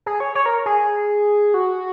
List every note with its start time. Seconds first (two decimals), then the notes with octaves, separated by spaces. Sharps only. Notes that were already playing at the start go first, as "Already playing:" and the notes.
0.06 G#4
0.20 C#5
0.35 C#5
0.46 A#4
0.66 G#4
1.54 F#4